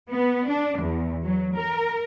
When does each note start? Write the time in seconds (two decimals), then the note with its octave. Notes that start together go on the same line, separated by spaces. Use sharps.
0.12 B3
0.48 D4
0.79 E2
1.24 F#3
1.57 A#4